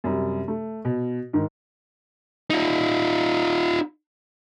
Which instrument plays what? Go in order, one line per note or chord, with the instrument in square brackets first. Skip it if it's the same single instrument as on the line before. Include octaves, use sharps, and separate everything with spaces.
[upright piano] F#2 C3 G3
A3
B2
G#2 D#3
[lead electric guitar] D#4 F4